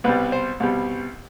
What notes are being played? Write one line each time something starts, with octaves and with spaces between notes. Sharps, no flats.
C2 B2 G3 B4
C5
C2 B2 G3